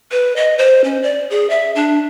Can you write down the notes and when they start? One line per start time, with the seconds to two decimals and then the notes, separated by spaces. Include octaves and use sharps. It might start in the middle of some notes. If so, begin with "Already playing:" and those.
0.12 B4
0.36 D#5
0.58 C5
0.84 C#4
1.03 D5
1.30 G#4
1.50 E5
1.75 D4